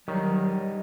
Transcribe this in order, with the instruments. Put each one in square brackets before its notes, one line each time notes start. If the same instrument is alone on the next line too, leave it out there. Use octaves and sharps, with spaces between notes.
[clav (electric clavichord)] D#3 [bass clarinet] F#3 [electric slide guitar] G3 D#4